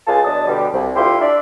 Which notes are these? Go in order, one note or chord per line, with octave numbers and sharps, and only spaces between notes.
C#2 F4 G#4 A5
E2 F#3 D4 D#5 A5 D#6
B2 D3 G3
C2
D2 E4 F4 G4 C6
D4 D5 E5